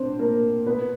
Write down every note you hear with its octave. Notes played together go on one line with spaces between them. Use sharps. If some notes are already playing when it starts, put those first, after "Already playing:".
Already playing: C4 D4 C5
A#3 A#4
B3 B4